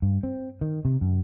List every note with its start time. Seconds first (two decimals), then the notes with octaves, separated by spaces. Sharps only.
0.02 G2
0.23 C4
0.61 D#3
0.85 C3
1.01 F#2